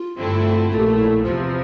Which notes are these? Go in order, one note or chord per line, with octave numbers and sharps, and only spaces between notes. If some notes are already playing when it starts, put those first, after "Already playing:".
Already playing: F4
G2 D3 A3 C4 E4
A#1 A#2 A3 F4
G4
F4
E4
E2 C3 F3 F4